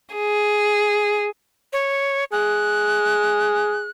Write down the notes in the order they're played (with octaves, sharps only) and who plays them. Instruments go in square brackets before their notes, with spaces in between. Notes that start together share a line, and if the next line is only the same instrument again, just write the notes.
[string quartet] G#4
[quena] C#5
[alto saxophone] G#4 [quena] F#6